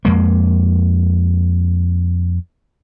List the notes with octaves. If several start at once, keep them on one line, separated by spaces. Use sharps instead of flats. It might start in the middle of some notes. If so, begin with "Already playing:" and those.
F2 G#3 A#3